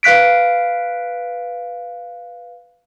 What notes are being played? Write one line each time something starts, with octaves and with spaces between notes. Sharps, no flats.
B4 F5 F#6 B6 D7